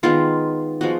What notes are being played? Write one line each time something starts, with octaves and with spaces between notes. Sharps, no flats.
D#3 G#3 B3 F4
F3 G#3 B3 F#4